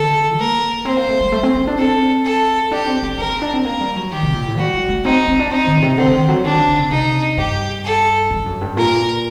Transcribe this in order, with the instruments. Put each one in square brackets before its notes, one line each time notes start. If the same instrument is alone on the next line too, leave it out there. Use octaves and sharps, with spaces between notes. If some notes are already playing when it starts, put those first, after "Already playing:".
Already playing: [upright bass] D3 [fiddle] A4
[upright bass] A#3 [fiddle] A#4
[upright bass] C4 [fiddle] C5
[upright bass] A#3
A3
G3
A3
C4
C4
D4
[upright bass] C4 [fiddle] A4
[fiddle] A4
[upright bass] D4 [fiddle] G4
[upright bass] C4
C4
[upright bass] D4 [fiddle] A#4
[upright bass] C4
D4
C4
[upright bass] A#3 [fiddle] A#4
[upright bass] G3
F#3
[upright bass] D#3 [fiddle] G4
[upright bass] C3
A#2
A2
[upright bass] G3 [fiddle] F#4
[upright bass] A3
A3
[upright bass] C4 [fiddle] D#4
[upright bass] C4
D4
[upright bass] C4 [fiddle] D#4
[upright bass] D#3
A#2
C3
[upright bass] D3 [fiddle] C4
[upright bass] D3
D#3
F#3
[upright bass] D#3 [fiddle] D4
[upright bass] D3
D3
C3
[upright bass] C3 [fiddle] D#4
[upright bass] G2 [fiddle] G4
[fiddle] A4
[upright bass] G2
F#2
G2
[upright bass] A#2 [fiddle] A#4